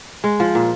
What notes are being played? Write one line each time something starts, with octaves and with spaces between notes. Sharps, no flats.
G#3
F3
A#2